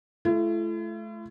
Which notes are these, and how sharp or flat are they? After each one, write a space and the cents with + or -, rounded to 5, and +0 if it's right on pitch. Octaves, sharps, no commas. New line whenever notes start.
A3 -30 E4 +45